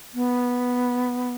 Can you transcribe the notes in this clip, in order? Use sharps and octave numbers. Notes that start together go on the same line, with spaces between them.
B3